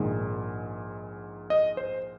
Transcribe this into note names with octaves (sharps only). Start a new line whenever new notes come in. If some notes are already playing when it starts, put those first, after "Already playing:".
Already playing: A#1 G#2 D#3 G#3
D#5
C5